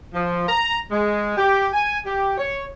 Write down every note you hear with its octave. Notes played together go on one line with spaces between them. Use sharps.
F3
A#5
G#3
G4
G#5
G4
C#5